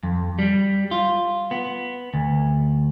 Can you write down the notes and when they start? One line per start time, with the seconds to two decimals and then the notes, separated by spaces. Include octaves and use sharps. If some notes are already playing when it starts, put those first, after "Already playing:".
0.03 F2
0.39 G3
0.91 F4
1.51 B3
2.14 D2